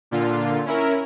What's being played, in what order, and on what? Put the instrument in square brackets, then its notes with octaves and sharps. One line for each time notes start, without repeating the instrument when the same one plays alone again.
[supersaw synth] A#2 D3 F4
C#4 E4 A#4